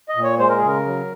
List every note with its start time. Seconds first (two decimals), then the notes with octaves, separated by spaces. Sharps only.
0.09 D#5
0.16 A#2
0.24 C#5
0.39 G#3 C5
0.49 A#4
0.58 G#4
0.63 C#3 A#4
0.86 F#3